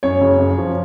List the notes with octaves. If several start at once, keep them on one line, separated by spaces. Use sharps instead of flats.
F#2 C#5
F#1
F#2
F3